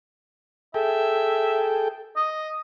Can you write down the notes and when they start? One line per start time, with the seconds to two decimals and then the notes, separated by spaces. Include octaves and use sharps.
0.74 G#4 A4 E5 G5
2.17 D#5